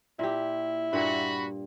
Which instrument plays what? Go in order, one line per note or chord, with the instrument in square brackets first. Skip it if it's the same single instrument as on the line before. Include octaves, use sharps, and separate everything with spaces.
[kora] A#2 G4 [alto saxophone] E4
[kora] G2 A#2 A#3 [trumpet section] F#4 B5